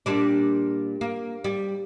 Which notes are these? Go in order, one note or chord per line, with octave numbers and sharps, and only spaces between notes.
A#2 G3 D4
A#3
G3